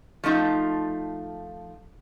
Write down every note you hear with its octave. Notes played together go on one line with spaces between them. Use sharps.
F3 A3 D#4 F4